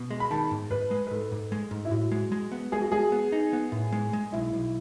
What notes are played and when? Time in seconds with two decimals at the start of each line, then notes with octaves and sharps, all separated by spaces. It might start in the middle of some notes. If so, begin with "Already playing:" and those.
Already playing: B2
0.10 G#3
0.20 B5
0.31 D#3 A5
0.51 G#2
0.71 G#2 B4
0.91 G#3
1.07 B4
1.11 G#2 A4
1.32 G#2
1.52 G#3
1.71 G#2
1.85 E4
1.91 A2 F#4
2.12 G#3
2.32 G#3
2.52 B3
2.72 G#3 G#4
2.81 F#4
2.92 G#3 G#4
3.12 B3
3.32 D#4
3.53 B3
3.72 A2
3.92 G#3
4.13 G#3
4.32 B1 E4
4.53 B1